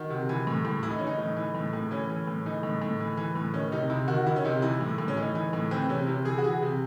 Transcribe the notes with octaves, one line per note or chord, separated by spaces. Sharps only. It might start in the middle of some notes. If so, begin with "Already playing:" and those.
Already playing: D#3 F#4
C3
E3
A2
A2
E3 E4
D#4
E3 C#4
D#4
A2
E3
A2
A2
E3 C#4
E3
A2
E3 D#4
A2
A2
E3
E3
A2
D#3 C#4
C3 D#4
C3 E4
D#3 F#4
D#3 E4
C#4
C3 D#4
E3 E4
A2
A2
C#4
E3 D#4
E3
A2
E3 C4
C3 C#4
C3 E4
E3 G#4
F#4
E3 G#4
C3